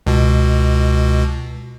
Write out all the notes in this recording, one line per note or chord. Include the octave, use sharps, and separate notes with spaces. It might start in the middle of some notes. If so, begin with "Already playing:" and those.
C#2 B2